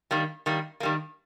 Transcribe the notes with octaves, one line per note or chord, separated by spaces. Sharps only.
D#3 G3 A#3
D#3 G3 A#3
D#3 G3 A#3